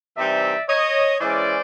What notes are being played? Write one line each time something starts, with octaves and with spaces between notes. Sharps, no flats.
C3 E3 G3 C4 D#4 D5 E5
C#5 D#5
E3 G#3 C#4 C5 D5